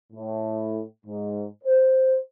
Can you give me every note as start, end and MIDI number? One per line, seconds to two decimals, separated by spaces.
0.12 0.82 45
1.06 1.44 44
1.64 2.16 72